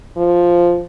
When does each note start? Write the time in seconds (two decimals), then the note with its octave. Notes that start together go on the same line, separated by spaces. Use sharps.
0.17 F3